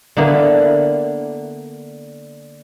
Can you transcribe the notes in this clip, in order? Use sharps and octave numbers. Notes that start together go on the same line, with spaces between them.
D3 A#3 B3 E4